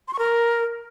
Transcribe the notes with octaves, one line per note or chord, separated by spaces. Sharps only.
C6
C#6
A#4